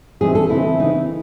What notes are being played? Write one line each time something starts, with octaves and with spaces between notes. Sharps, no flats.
A2 E3 A3 C4 D#4 G#4
A4
C#3 E3 C4 D#4 E4
C#3 E3 C4 D#4